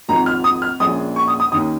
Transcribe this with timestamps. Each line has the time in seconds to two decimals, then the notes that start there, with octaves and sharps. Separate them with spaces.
0.08 G#1 G#2 F3 A#5
0.26 F6
0.44 D#6
0.62 F6
0.80 A#1 A#2 G#3 C#4 D#6
1.16 C#6
1.28 D#6
1.40 D#6
1.52 D#2 D#3 C#4 D#6